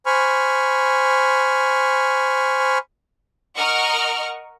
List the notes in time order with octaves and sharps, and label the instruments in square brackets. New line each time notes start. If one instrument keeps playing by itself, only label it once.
[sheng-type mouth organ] C5 G#5 B5 C#6 F6
[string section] A#4 D#5 F#5 C#6 F6